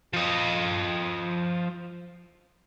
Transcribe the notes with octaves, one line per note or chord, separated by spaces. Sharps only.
F3 D#5